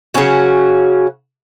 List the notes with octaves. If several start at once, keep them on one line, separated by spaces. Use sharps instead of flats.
C#3 F#3 C#4 F#4